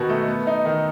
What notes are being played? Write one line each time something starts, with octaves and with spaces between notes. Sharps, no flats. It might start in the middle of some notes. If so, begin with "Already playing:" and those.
Already playing: B2 D#3 D#4 F#4
A3
B3
D#4
D#3